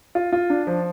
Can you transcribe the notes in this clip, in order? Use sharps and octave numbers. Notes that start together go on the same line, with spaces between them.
F4
F4
D4
F3